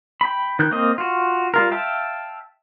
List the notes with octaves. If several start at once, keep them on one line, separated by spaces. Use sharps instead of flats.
G5 B5
D#3 F#6 G6
A#3 C4 D#5
F4 F#4
G3 F4 A#4
E5 F5 G5 A5